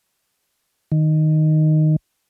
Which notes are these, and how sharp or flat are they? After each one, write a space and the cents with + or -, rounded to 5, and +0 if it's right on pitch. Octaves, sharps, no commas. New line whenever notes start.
D#3 -5